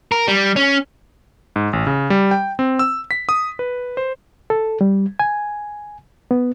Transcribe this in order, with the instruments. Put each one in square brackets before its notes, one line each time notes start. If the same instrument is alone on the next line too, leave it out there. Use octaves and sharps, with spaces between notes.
[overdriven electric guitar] A#4
G3
C#4
[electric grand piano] G#2
A1
C#3
G3
G5
C4
E6
B6
D#6
B4
C5
[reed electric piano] A4
G3
G#5
B3